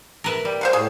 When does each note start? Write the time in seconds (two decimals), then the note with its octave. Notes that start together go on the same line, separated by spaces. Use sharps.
0.24 A#4 B4 E5
0.45 G3
0.61 C5 F5 F#5
0.73 A2 G#4